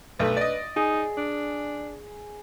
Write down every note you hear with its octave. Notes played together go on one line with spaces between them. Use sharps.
B1 A3 B4
D5 D#5
D#4 G#4
D4